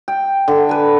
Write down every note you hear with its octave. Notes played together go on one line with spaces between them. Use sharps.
G5
D3
B4 G#5